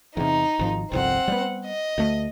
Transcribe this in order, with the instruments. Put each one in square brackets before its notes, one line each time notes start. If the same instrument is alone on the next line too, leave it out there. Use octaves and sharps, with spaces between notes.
[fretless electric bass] E2 C3 [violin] D#4
[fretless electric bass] G#1 F3
[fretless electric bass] G1 C2 F2 [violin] C4 F#5
[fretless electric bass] G3 B3
[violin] D#5
[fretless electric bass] D2 A3